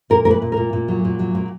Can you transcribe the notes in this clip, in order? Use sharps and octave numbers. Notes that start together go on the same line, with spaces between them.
A#2 A#4
A#3 A#4
B4
A#2
A#2 A#4
A#2
F#3
A#2
F#3
A#2